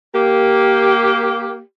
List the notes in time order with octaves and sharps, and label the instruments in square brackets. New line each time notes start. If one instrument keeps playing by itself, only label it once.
[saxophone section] A#3 G4